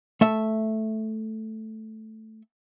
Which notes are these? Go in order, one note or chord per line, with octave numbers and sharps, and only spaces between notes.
A3 E5